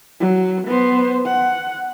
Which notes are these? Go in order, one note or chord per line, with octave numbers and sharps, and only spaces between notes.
F#3
B3 C5
F#5